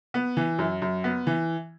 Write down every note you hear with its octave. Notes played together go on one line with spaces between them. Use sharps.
B3
E3
F#2
F#2
B3
E3